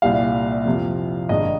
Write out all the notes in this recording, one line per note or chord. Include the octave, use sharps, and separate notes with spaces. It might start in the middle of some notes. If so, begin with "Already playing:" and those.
C2 A#2 G3 F5
F2 C3 F3
G#1 G2 D#3 G#3 D#5